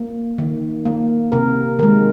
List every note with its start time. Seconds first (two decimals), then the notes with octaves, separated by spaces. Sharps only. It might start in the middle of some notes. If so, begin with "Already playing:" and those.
Already playing: A#3
0.38 D#3
0.85 A#3
1.32 C3 A#4
1.79 D#3 G#3 A#4